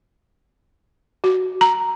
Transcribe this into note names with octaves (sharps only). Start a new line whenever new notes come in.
F#4
A#5